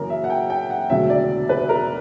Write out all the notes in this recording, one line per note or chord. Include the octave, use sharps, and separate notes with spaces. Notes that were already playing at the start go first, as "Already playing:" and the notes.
Already playing: F#2 C#3 E3 A#3 A#4
E5
F#5
G5
G5
F#5
E1 D2 C#3 F#3 E5
D5
B4
A#4